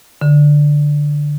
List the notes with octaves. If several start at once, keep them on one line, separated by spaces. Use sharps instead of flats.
D3